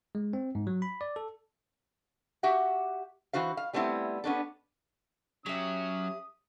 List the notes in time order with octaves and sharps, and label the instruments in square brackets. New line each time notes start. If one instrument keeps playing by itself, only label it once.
[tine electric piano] G#3
C4
G#2
F#3
B5
D5
A4
[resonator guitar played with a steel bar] F#4 G4 E5 F#5
E3 F#4 C5 F5
F5
G3 A3 B3 C4 E4
B3 C#4 D4 A4
[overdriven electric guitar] F#3 [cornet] C#4 [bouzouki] G4 E5 [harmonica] D#6